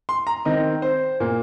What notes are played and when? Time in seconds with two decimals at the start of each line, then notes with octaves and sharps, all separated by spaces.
0.09 C6
0.27 A#5
0.45 D#3 C4 D#5
0.82 C5
1.20 A#2 A#3